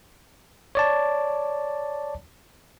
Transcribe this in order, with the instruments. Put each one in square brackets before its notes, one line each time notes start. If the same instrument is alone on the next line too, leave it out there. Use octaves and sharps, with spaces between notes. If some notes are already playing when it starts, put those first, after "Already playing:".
[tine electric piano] C#5 D5 A5